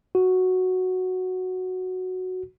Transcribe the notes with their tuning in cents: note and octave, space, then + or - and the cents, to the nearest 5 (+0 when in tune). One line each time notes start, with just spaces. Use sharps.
F#4 +0